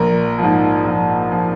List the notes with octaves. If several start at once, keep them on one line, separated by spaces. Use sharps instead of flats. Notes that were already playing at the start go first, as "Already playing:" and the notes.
Already playing: A#1 A#4
G#2 F3
A#1
F3